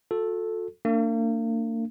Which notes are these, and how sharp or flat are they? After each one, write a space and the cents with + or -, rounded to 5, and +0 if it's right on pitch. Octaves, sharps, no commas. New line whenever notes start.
F#4 -45 A4 +0
A#3 -40 D4 +0